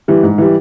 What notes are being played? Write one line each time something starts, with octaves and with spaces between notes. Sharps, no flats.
E3 G3
G#2
E3 G3